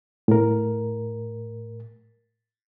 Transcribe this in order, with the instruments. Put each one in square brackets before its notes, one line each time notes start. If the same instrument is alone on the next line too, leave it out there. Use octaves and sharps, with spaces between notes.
[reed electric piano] A2 A#4